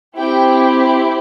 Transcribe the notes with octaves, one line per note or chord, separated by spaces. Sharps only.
C4 E4 G4 G5